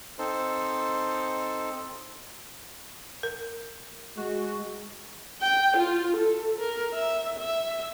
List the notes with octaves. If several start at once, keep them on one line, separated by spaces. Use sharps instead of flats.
C4 D#4 A4 C5
A#4
G#3 F#4
G5
F4
A4
A#4
E5
E5